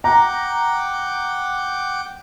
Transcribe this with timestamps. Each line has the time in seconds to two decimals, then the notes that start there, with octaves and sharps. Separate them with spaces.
0.04 F#5 G5 A#5 D6